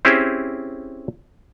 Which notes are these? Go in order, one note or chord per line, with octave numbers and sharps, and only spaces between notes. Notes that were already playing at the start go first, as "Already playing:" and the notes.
C4 C#4 E4 G4 G#4 C5